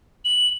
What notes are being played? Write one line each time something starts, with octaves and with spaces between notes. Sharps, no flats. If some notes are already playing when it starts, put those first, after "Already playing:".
F#7